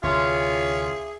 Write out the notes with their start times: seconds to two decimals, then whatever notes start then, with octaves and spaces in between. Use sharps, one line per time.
0.03 D2 C3 E3 C#4 F4 G#4 E5